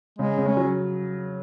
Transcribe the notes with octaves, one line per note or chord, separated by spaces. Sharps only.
C#3 G#3
C#3
C#4
F#3